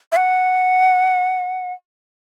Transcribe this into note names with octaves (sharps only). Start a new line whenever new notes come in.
E5
F#5